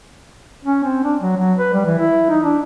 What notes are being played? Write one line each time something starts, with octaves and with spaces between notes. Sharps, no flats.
C#4
C4
D4
F#3
F#3
B4
G3
E3
E4
D#4
D4